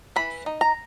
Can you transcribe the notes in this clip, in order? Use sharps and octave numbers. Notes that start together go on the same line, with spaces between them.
E3 B5
D#4
A#5